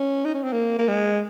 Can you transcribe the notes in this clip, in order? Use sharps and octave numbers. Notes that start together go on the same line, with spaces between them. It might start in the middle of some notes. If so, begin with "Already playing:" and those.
Already playing: C#4
D#4
C#4
C4
A#3
A#3
G#3